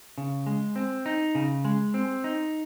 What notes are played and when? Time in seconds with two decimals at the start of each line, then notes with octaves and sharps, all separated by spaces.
0.18 C#3
0.46 G#3
0.76 C4
1.06 D#4
1.35 C#3
1.65 G#3
1.94 C4
2.24 D#4